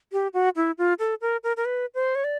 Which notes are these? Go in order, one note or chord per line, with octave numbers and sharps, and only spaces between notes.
G4
F#4
E4
F4
A4
A#4
A#4
A#4
B4
C5
C#5
D5